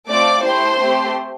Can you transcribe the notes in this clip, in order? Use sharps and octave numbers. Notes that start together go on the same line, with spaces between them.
A3 C4 F4 D5 D6
A3 E4 G4 C5 C6
A3 C4 G4